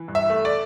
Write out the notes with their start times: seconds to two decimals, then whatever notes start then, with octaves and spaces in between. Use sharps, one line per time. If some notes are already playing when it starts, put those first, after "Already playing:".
Already playing: E3
0.08 G2
0.15 E5
0.30 A3
0.45 D5